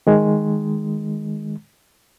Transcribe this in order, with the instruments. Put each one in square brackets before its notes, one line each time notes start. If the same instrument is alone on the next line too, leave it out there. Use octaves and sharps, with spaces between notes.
[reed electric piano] D#3 G#3